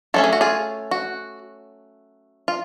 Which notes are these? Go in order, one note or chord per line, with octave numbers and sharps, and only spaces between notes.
F#3 A3 C#4 A4
G#4
F#4
F4 G#4
F#4
F4